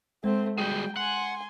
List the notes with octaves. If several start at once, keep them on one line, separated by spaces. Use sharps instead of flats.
G#3 A3 C4
G3 F#4 G#4 G5
F#5 G#5 C6